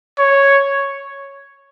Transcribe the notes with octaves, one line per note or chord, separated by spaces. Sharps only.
C#5